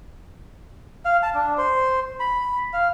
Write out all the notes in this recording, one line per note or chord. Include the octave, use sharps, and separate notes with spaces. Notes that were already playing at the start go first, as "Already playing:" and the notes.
F5
A5
D4
C5
B5
F5